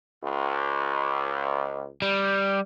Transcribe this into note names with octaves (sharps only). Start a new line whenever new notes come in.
C#2
G3